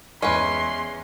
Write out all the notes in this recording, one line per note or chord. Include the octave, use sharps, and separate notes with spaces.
E2 G#3 C#4 B4 C6